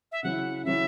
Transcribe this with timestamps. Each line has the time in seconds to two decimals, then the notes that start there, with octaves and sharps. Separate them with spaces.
0.12 E5
0.23 C#3 F#3 C#4 E4 F#5
0.65 C#3 F#3 C#4 E4 E5